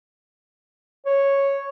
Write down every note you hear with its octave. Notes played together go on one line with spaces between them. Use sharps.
C#5